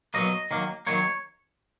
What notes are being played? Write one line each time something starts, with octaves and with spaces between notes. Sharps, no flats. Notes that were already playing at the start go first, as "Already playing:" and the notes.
B2 F#3 A#3 D#5
D#3 F#3 A#3
D#3 F#3 A#3 C#5